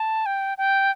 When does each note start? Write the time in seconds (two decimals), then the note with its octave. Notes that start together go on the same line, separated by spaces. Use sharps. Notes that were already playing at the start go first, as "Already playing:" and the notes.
Already playing: A5
0.26 G5
0.58 G5